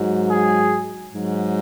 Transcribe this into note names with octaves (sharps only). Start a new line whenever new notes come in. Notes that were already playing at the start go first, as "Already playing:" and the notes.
Already playing: G#2 F#3
G#4
G#2 F#3